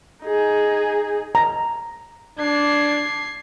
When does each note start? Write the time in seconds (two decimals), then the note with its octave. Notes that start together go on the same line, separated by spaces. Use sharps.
0.25 D#4 G#4
1.35 A#5
2.39 D4 G#6 C7